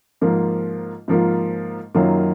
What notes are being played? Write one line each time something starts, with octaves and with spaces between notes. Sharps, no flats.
G#2 F3 A#3 F4
G#2 F3 A#3 F4
F#2 D#3 F#3 A#3 F4